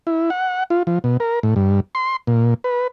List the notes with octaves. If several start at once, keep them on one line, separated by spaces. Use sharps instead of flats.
E4
F#5
F4
F3
B2
A#4
A2
G2
C6
A#2
B4